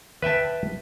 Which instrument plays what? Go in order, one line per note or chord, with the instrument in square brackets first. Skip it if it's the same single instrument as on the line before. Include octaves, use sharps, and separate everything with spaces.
[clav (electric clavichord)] B4 E5 G5 A5